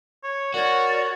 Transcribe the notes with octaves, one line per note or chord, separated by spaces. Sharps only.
C#5
F#4 A#4 C#5 D5